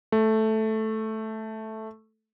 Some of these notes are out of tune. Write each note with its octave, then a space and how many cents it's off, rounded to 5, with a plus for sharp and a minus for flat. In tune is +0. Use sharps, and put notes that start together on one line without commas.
A3 -5